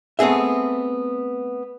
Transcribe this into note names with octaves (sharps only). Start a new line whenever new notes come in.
A3 B3 C4 G#4 E5